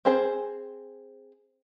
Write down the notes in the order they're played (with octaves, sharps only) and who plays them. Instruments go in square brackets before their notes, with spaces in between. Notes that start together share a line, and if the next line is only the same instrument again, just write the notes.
[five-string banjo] C4 G#4 C5